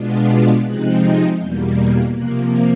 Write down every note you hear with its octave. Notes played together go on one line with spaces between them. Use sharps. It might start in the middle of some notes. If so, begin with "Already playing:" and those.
Already playing: B2 G#3 B3 D4 F4
D6
C3 F3 G#3 C4 D#4 F#6
E2 B2 G3 A#3 G6
G#6
C3 F3 A#3 F#6